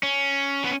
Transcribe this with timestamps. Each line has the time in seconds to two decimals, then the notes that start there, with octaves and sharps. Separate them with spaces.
0.03 C#4
0.64 B3